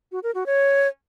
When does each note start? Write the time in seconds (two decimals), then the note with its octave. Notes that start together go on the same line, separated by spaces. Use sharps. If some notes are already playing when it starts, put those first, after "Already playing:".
0.12 F#4
0.23 A#4
0.35 F#4
0.46 C#5